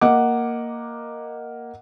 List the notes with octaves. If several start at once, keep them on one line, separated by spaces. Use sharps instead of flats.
A#3 D#5 F#5 D6